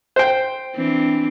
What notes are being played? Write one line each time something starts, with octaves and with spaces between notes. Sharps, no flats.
C5 G5
E3 C4 D4